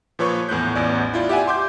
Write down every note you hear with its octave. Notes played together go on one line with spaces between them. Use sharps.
A#2 F3 B4 C#5 C#6
E2 A2 F#6 G6
A1 E2 D5
E4 F4 D5
G4 D5 E5 F#5 G#5
C6 D6 G6